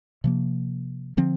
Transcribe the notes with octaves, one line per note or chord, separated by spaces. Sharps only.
C3 F3 A#3
D3 F3 C4